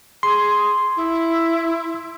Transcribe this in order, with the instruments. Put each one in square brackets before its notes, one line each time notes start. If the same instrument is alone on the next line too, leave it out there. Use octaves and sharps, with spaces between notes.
[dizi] G#4 [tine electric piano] C6
[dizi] E4